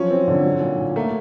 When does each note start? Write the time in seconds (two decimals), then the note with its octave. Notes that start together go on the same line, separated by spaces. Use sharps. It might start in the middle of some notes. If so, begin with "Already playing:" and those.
Already playing: F3 F#3 C#4
0.11 C4
0.28 D3
0.45 F#3
0.61 A#2
0.79 A#2
0.96 A3 A#3